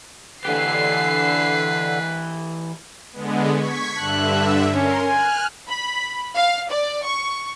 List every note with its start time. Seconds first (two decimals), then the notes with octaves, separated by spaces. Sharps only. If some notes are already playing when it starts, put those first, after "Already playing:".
0.45 D3 E3 G4 B4 C7
3.13 D3 G#3 B3
3.54 C#6 G#6 B6
3.98 G2 D3 E5 A5 F#6
4.74 C#4 A#4 C6
5.07 G#5 F6 F#6
5.68 B5
6.36 F5
6.70 D5
7.05 C#6